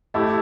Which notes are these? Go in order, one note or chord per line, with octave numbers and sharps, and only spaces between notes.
A3 E4 G4